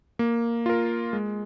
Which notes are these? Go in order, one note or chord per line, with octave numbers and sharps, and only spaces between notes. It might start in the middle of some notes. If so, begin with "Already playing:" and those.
A#3
F4 A#4
G#3